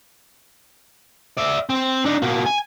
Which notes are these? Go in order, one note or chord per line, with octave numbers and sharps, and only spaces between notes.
D5 E5
C4
D4 D#4
B2 A#3
G#5